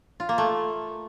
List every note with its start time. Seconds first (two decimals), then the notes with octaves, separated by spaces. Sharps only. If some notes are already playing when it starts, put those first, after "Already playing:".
0.20 F4
0.29 A#3
0.38 A3